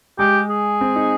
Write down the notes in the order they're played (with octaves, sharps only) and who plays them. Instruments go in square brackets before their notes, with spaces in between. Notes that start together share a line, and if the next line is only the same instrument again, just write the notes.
[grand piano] G#3 [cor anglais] G4
[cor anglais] G#4
[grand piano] C4
D#4